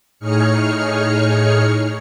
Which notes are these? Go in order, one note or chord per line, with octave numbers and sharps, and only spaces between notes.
A2 D#4 G#4 C#5 F6 C#7